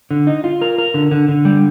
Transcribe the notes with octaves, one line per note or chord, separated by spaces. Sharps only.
D3
D#4
F4
A#4
A#4
D3
D3
D3
G3